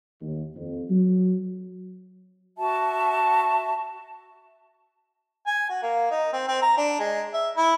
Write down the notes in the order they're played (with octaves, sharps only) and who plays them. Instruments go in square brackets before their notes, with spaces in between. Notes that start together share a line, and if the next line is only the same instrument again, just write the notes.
[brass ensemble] D#2
F2
F#3
[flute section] F#4 E5 A5
[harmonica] G#5
F#4
A#3
D#4
C4
C4
A#5
D4
G#3
E5
E4